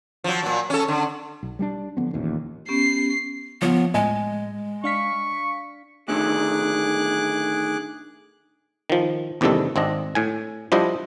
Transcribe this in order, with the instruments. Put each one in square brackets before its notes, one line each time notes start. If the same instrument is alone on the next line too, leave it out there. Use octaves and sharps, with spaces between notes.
[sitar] F3 F#3
A#2 F#3
C#4 A4
D3
[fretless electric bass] B1
G3 G#3 D4
D3 F3 B3 C4
E1 A1 D#2 A#2
[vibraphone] B3 C#4 G4 [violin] C7
[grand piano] F3 [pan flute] B3 [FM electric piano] C#5
[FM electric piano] A2 [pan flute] G#3 [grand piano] D#5 G#5
[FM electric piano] D4 F5 B6 [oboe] C#6
[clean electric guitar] A2 D3 D#3 [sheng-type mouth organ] G#4 D6 F#6
[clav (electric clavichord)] D#3 F3
A1 E2 C3 D#3 G3 A4
G#1 C4 D4 D#5
A2 G#5
F3 G3 D4 E4 C5 D#5